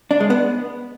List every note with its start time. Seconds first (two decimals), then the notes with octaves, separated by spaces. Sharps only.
0.11 D4
0.20 G#3
0.30 B3